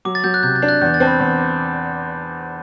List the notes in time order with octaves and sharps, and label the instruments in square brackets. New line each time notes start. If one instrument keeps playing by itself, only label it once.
[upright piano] F#3 [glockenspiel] D6
[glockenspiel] A6
[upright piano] F#3 [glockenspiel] G6
[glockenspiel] F#6
[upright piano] C3 [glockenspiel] G6
[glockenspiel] F#6 A6
[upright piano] D4
[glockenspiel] F#6 A6
[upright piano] E2 [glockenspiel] G6
[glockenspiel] F#6 A6
[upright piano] C4 [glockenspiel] A5
[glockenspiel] B5
[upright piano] E2 [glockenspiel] C6
[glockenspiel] D6